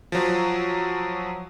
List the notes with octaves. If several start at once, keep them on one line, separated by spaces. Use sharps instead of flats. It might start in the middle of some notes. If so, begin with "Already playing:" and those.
F3 F#3